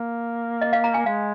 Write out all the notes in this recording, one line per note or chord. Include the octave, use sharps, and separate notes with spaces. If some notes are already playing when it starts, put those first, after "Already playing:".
Already playing: A#3
D#5
F5
A#5
G#5
G#3 F5